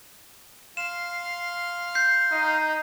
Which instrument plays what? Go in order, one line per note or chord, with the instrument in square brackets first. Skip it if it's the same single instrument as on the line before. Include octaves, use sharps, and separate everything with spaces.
[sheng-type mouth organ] F5 C6 F6 [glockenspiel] E7
[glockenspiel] G6 C7
[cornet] D#4